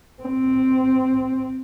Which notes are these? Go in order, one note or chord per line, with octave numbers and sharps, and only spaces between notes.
C4